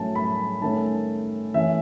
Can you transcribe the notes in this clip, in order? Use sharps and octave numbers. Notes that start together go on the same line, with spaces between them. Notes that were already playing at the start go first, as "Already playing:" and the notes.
Already playing: A2 F#3 A3 C#4 A5
B5
D#3 A3 C#4 A5
E3 A3 C#4 E5